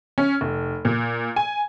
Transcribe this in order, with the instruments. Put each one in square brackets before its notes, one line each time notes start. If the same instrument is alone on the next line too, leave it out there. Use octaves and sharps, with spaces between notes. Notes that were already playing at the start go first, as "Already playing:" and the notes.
[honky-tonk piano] C#4
F1
A#2
G#5